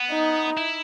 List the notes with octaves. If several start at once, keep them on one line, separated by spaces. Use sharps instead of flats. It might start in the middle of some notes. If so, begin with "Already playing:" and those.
Already playing: B3
D#4
E4